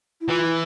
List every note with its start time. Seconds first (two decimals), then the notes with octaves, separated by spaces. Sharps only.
0.21 E4
0.28 E3 F4
0.44 E4